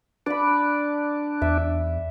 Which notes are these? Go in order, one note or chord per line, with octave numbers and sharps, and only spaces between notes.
D4 D5 B5
E2 E5